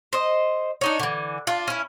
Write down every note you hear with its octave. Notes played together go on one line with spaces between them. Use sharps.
C5 D#5
D4 D#4 C#5
D3 E3
D4 F4
C#4 E4